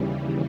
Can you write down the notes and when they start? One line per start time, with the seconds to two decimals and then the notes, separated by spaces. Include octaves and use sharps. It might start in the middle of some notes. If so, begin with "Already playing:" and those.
Already playing: D#2 C#3 E3 G3